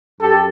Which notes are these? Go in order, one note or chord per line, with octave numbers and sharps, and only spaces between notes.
F#2 G4 A4